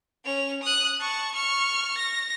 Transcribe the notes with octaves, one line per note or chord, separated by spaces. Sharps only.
C#4 F7
D#6 F#6
A5 C#6
C#6 F6
A#6